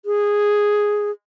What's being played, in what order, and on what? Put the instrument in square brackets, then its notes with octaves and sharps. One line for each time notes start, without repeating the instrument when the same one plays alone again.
[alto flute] G#4